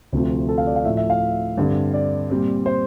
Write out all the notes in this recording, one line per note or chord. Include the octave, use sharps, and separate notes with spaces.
D2 C3 F3 A3 C4
A4
F5
D5
F5
A2 F3 A3 E5
E5
F5
G2 D3 G3 C4
D5
A#2 G3 C4
C5